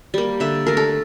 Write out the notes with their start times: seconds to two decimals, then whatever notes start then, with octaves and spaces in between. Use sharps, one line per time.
0.14 G3 A#3
0.40 D3 E5
0.66 A3 A#4
0.77 A4